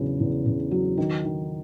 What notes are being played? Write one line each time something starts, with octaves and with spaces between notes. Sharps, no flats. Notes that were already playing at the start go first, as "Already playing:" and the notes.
Already playing: E2 C#3 F#3
E2
C#3
F#3
D#3
D#3